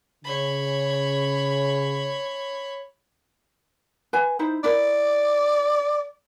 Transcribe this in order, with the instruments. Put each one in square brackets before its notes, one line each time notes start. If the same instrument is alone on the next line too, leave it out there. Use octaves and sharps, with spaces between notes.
[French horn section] C#3 [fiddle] C#5 B5
[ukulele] B4 G#5
D#4 E4 C5
[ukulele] E4 A#4 [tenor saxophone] D5